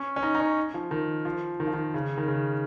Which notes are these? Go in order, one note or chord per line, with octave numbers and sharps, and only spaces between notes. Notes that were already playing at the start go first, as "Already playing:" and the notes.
Already playing: C#4
C#4
D#4
D#4
C#4
F3
D#3
F3
D#3
F3
D#3
C#3
D#3
C#3